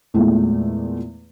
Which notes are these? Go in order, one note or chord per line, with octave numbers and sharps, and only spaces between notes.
E2 A#2 E3 G#3 A3